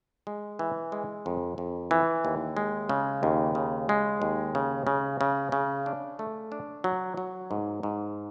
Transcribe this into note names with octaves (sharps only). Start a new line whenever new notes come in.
G#3
E3
G#3
F2
F2
E3
D#2
G#3
C#3
D#2
C#3
G#3
D#2
C#3
C#3
C#3
C#3
D4
A3
D4
F#3
F#3
G#2
G#2